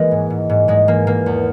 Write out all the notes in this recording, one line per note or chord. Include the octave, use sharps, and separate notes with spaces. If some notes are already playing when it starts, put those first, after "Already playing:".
Already playing: E3 G#3 A#3
G#2
G#2
G#2
G#2 G#3
E3 A#3
E3 A#3
E2